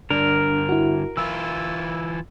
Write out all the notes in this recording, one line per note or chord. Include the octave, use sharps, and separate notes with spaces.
G2 D3 D4 A#4
E4 F#4
E3 E4 F4 E6